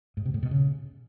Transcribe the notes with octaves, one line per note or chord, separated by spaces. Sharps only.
G#2
C3
A2
B2
C#3